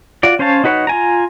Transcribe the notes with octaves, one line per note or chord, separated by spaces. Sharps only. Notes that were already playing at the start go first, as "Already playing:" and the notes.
F4 F#4 D5
C#4 C5 C#5 F5 A5
D#4 F#4 B4 C#5
F4 G#5 A#5